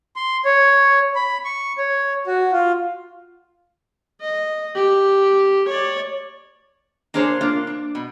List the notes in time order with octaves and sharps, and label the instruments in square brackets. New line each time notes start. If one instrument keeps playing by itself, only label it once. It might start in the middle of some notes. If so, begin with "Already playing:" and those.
[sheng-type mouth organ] C6
C#5
B5
C#6
C#5
F#4
F4
[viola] D#5
G4
C#5 D5
[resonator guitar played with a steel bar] A#3 D4 G#4 C5 C#5
A#3 D4 F4
D4
B2